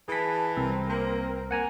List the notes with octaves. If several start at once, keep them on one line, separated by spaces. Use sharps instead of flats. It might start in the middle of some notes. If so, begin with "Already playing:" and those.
E3 G#4 A5 B6
C2 C4 A#4
A#3
A#3 F#5 G#5 A#5